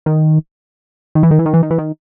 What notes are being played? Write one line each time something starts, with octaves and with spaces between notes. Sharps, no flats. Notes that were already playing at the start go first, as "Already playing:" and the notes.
D#3
D#3
E3
D#3
E3
D#3
E3
D#3
E3
D#3